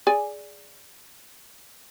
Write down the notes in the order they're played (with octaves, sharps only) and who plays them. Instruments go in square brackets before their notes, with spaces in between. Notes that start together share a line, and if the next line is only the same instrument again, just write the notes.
[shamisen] G#4 D5 G#5